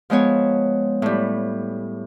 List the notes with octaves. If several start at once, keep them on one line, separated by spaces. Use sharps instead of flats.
F3 G#3 B3 C#5
A2 G3